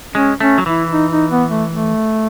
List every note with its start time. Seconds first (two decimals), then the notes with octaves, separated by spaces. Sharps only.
0.14 G#3 C#4
0.40 A3 C#4
0.58 F#3
0.66 E3 E4
0.92 D#4
1.12 D#4
1.31 B3
1.50 A3
1.69 A3